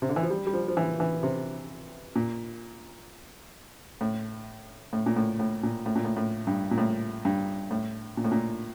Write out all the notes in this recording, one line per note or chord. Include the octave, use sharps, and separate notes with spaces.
C3
D3
E3
F3
G3
G3
F3
F3
E3
E3
C3
A#2
A2
A2
A#2
A2
A2
A#2
A2
A#2
A2
A2
G2
A#2
A2
G2
A2
A#2
A2
A#2